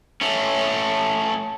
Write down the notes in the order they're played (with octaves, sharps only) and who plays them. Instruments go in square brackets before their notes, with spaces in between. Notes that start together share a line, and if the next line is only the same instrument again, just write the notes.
[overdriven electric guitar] A3 C#4